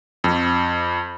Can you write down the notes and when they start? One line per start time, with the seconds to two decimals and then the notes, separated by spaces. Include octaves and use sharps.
0.24 F2